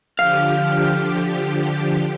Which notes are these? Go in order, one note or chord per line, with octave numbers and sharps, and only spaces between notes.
D3 F3 G4 F5